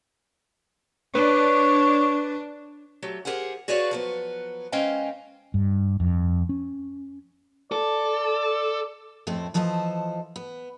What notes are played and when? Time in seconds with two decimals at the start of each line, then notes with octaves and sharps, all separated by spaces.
1.15 D4 B4 C#5
3.02 F#3 A3 G4
3.25 G4 G#4 A#4 C5 F#5
3.68 F#4 G#4 B4 C#5 D5 F5
3.91 F3 F#3 B3
4.72 G#3 C#4 C5 D#5 F5 G5
5.54 G2
6.00 F2
6.49 C#4
7.72 A4 D5
9.27 F2 A2 A3 C4
9.54 E3 F3 A4 C5 C#5 D#5
10.36 B3